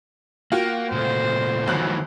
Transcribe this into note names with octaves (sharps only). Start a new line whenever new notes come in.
A#3 F4 F#4 G5
A#2 C#3 A3 C5
G1 D2 D#3 E3 F#3 F#6